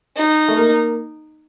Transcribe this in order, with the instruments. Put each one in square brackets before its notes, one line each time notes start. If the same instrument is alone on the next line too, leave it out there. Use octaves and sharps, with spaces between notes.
[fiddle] D#4
[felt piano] A3
A#3